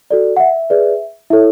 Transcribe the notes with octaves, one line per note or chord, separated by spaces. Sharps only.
F#4 A4 D5
F#5
E5
G#4 B4 D5
E4 A4 C#5 E5